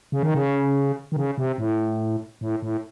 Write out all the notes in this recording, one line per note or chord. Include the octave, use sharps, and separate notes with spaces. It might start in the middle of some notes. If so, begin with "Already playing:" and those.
C#3
D#3
C#3
D#3
C#3
C3
A2
A2
A2